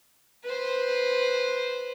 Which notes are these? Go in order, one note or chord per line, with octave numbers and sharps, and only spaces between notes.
B4 C5